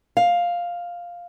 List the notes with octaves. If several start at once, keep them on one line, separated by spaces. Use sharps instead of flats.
F5